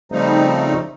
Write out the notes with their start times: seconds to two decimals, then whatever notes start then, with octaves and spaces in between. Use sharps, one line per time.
0.12 C#3 F3 G3 A3 C4 D#4